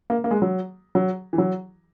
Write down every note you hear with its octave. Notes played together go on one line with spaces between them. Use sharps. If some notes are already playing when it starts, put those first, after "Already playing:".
A#3
A#3
G#3
F#3
F#3
E3
F#3